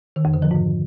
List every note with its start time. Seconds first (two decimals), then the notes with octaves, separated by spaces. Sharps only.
0.16 D#3
0.25 F2
0.34 D3
0.42 F3
0.51 G#2